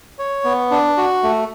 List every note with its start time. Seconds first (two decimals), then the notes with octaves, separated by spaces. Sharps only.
0.19 C#5
0.44 B3
0.71 D4
0.97 F#4
1.23 A3